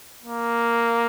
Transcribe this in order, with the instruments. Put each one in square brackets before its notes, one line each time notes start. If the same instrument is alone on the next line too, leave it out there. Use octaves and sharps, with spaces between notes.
[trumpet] A#3